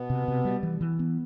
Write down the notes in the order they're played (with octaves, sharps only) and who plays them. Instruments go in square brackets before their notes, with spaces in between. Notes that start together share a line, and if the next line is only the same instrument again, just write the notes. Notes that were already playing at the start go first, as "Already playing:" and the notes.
Already playing: [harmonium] B2 B3
[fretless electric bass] C3
C3
G3
E3
E3
B3